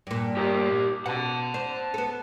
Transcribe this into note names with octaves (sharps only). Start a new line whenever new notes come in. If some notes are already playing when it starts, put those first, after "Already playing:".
G2 A#2
G4 A#4
B2 F#5 A5
C5
B3 A4